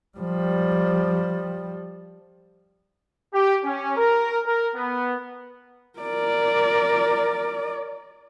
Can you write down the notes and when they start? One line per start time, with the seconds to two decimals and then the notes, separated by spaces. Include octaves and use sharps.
0.18 F3 G3
3.34 G4
3.64 C#4
3.97 A#4
4.46 A#4
4.75 B3
5.99 A#4 D5